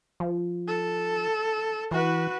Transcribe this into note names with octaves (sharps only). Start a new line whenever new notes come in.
F3
A4
E3 F#4 B4